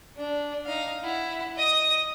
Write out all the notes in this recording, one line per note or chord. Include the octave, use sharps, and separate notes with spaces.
D4
D#4 F5
E4 F#5
D#5 D#6